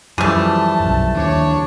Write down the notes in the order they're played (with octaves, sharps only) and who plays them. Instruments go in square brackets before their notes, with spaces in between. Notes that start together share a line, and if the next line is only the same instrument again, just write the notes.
[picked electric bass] F#2 [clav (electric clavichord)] E3 F3 G3 [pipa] A3 G#4 [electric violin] A5
[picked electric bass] B1 F#2
[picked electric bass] D#2 [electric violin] D4 C#5